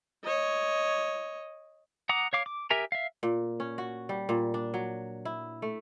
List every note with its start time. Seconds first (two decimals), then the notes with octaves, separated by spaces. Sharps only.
0.24 C#5 D#5
2.09 F#5 A#5 D6 D#6
2.33 C#5 F5 D6
2.46 D6
2.70 G4 A#4 E5 G#5 A#5
2.92 E5 F5
3.23 A#2
3.60 C#4
3.78 F#4
4.09 G3
4.29 A#2
4.54 D4
4.74 F#3
5.25 E4
5.62 A3